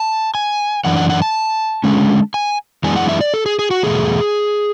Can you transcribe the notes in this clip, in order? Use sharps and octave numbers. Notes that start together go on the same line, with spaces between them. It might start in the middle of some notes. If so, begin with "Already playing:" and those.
Already playing: A5
G#5
F#2 E3 D4 F#5
F#5
F#5
A5
D3 G#3 C#4
G#5
F#2 E3 G#3 B3 D4 G#5
F#5
E5
D5
A4
G#4
G#4
F#4
E2 B2 A3 G#4